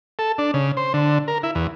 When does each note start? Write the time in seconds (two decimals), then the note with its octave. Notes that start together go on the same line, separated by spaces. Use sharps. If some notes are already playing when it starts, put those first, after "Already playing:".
0.19 A4
0.38 D4
0.54 C#3
0.77 C5
0.94 D3
1.28 A#4
1.43 E4
1.55 E2